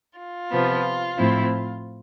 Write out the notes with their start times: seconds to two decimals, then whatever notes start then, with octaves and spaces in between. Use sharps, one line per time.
0.17 F4
0.51 C3 F3 B3
1.17 A2 F3 C4 E4